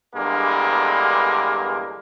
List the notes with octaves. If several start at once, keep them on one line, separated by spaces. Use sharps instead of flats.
E2 G2 D3 G#3 A#3